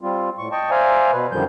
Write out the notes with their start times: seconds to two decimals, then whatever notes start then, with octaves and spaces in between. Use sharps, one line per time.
0.01 G3 C4 F4
0.38 A2 C#6
0.52 D#5 G5 A5 C#6
0.71 C5 D5 E5 F5 G#5 A#5
1.12 B2 B4
1.32 F#2 D3 D#3 F3 G3 G6